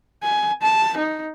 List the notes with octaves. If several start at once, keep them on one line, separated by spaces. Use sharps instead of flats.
G#5
A5
D#4